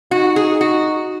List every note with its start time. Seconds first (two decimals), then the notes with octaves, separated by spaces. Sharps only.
0.11 D#4 F#4
0.36 G#4
0.61 F#4